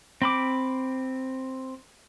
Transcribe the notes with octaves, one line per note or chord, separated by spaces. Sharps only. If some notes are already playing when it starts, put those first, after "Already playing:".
C4 B5 D6